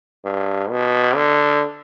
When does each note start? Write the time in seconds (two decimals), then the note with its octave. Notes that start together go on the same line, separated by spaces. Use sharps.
0.25 G2
0.70 B2
1.15 D3